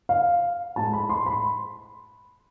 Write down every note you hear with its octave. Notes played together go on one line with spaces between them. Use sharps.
F5
A2 G#3 A5
B5
C6
B5